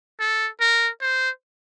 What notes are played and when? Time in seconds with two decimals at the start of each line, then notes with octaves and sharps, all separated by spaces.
0.20 A4
0.61 A#4
1.01 C5